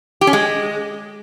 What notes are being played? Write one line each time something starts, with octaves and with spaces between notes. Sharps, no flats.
G4
C#4
G#3